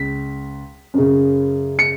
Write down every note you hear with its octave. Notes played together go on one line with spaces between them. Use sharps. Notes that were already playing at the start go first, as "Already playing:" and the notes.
Already playing: C#2 B6
F#2 C#3
C#7